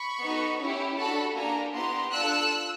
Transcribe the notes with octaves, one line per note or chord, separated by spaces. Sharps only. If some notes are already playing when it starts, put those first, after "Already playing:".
Already playing: B5 C#6
B3 D#4 F#4 A4
C#4 E4 G4
D4 F#4 A4 A5 B5
A#3 D4 G4 G#5 A#5
B3 E4 G4 A#5 C6
D4 F4 A4 E6 F#6